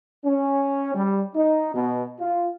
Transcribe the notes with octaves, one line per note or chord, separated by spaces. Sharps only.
C#4
G3
D#4
B2
F4